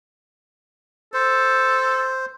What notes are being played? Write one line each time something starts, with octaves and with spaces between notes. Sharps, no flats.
A4 C5